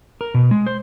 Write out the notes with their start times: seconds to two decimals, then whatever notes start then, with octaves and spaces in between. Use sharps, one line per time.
0.21 A#4
0.34 B2
0.51 G#3
0.67 C5